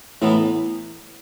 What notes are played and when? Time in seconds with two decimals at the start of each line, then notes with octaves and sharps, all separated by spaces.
0.22 A2 E3 B3 E4